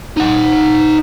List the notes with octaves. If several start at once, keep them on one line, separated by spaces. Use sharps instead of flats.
D#4 F#5